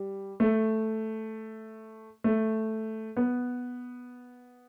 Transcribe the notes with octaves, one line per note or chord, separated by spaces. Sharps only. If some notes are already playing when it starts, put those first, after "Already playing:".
Already playing: G3
A3
A3
B3